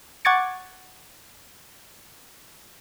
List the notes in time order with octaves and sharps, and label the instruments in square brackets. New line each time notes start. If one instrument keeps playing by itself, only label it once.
[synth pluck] F#5 C#6 D6 G#6 A6 C#7